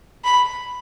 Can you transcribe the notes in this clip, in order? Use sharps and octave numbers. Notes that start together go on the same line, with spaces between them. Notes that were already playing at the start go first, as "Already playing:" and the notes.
B5